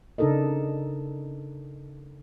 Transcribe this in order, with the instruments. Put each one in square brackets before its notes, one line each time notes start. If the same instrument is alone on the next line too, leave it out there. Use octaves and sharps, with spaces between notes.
[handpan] C#3 D4 D#4 A4 A#4 D#5